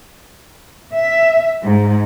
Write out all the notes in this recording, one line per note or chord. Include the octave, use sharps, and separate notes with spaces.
E5
G#2